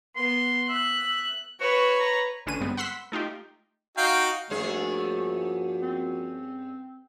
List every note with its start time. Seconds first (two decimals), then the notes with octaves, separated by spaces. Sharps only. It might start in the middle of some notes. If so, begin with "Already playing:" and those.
0.16 B3 C6
0.69 E5 F#6
1.61 F#4 B4 C#5
2.00 A#5
2.46 A1 D3 C#4 D4 B4 D#7
2.60 G2 G#3 B3 C4
2.77 F#5 B5 C6 E6 B6
3.12 A3 D#4 F4 G4
3.97 D#4 F#4 F5 G5
4.50 G2 F3 A3 A#3 C#4 F#4 G#4
5.82 C4